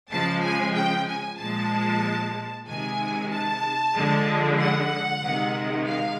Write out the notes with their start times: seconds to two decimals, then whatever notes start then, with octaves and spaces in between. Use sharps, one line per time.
0.11 C#3 F3 G#3 A5
0.42 G#5
0.74 G5
1.06 G#5
1.38 A#2 F3 G#3 A5
2.67 C3 D#3 G#3 G#5
3.30 A5
3.95 D3 F3 G#3
4.59 F#5
5.23 C3 D#3 G#3
5.86 F5